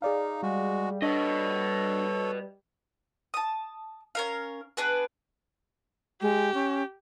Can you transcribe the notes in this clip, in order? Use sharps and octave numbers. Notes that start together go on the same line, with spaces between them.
D#4 G#4 D5 F5
G3 G#3 F#4
D4 A4 B4 C#5 D#5
A5 D#6
C#4 A#4 F5
B3 D4 G#4 B4
G#3 G4
C#4